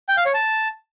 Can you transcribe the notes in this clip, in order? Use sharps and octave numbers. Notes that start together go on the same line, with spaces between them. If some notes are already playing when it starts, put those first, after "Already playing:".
G5
F5
C#5
A5